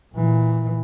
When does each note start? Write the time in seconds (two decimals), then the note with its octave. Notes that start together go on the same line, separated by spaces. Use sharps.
0.14 A#2 E3